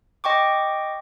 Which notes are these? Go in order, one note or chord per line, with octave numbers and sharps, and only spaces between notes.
D#5 G5 C#6 D6